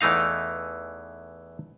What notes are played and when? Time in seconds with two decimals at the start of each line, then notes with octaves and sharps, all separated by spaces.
0.01 E2 E3 A3 D#4 F5